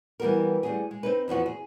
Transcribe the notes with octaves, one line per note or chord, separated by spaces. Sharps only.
E3 G3 B3 F#4 A#4
G3 A3 D4 F#4 G#4
G#3
C4 D#4 B4
E2 F3 B3 F#4
G#4